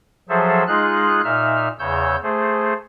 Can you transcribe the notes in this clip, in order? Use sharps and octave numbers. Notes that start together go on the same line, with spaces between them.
F3 F#3 G#4 A4 C5 E5
G#3 D#4 F4 G#4 F#6
A#2 D#4 E5 F6
E2 C#3 C#5 E6 G6
A3 G#4 C5